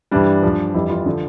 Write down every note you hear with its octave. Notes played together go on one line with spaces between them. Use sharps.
G2 E3 G3 D4
G2 F3
F2 E3 G3 E4
F4
D3 F3